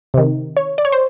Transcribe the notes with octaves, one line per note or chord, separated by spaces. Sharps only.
C3 D#3
C#5
D5
C#5
C5